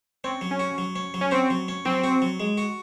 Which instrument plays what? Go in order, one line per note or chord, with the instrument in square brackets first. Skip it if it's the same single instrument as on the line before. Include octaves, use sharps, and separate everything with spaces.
[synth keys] C4 [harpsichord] C#4
[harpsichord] F#3
[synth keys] C#4
[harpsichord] F#4
F#3
C#4
F#3
[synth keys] C#4
[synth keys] C4 [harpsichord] F#4
[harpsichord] F#3
C#4
[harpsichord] F#3 [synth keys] C4
[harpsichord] F#4
F#3
G#3
F#4